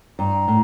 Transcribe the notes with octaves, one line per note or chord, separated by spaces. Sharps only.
G2 A#5
A2